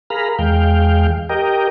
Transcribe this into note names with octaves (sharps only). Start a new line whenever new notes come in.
G#4 A#4 F5 A#5 B5
E2 G#3 F5 G5
G4 A#4 D#5 G5